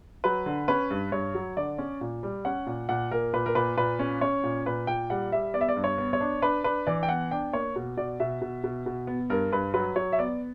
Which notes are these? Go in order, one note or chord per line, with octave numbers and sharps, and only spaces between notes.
F#3 B4
D3
C#4 B4
G2
G2 C#5
F#3
D3 D5
C#4
A#2
G3
C#4 F#5
A#2
A#2 F#5
A#2 A#4
A#2 B4
A#4
A#2 B4
A#2 B4
C#4
C#4 C#5
A#2
A#2 B4
A#2 G5
G3 F#5
G3 E5
B3 D5
E5
D5
G2
C#5
B3
C#5
D4
D4 B4
D4 B4
E3 D5
G5
B3 F#5
D4 G5
A#3 C#5
B2
B2 D5
B2 E5
B2
B2
B2
B3
G2 A#4
G2 B4
F#3 B4
F#3 C#5
E5
B3 D5